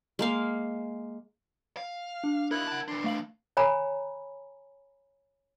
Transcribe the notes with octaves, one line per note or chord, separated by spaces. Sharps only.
G#3 A#3 F5
F5
D4
D#4 E4 A#4 F5 F#6
F#5 A5
E3 D4 C6
A3 F5 F#7
C#5 G#5 A#5 B5